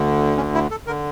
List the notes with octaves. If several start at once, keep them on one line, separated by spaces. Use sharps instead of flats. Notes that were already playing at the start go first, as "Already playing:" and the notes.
Already playing: D2 D3
C#4
E4
A4
D3 A#4